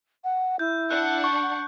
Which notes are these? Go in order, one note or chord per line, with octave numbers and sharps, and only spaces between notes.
F#5
E4 G6
D4 F#5 F#6
C#6